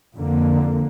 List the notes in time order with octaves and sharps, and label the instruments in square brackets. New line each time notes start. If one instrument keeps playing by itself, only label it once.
[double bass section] F2 D3 A#3